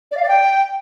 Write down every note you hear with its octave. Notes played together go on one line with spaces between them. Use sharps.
D5
F5
D5
G5